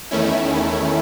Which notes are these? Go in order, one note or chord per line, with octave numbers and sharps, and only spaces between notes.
E2 D#3 A3 C#4 E4